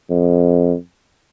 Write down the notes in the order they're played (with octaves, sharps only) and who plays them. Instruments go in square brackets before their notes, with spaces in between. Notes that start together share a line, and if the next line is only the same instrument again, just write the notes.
[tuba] F2